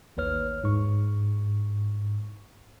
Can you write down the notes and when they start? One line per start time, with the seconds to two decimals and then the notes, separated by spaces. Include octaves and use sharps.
0.17 A1 D#2 B4 C#5 F6
0.64 G#2 C#6